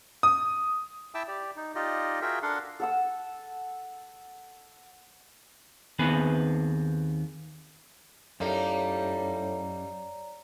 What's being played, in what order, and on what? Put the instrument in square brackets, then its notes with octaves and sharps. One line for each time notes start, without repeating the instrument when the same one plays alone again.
[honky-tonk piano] D#6
[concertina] E4 E5 G5 A5 D6 E6
G4 D5
D#4
D#4 F4 G4 D5 D#5
F4 F#4 G#4 A#4 E5 G5
D4 A4 A#4 F5 F#5 C6
[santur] A4 F#5 E6
[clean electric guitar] D#2 D#3 B3 C4 G#4 B4
[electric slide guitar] F#2 [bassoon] A2 [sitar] G3 A#3 D#4 [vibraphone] C#5 D5 A#5